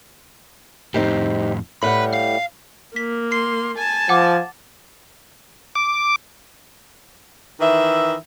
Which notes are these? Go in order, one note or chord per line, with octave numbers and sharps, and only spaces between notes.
F2 A2 C4 D#4 G4
A2 G3 B4 F#5 B5
F5
A#3 B6
C6 C7
G#5 A5
F3 F#5 D6
D6
D#3 E3 E5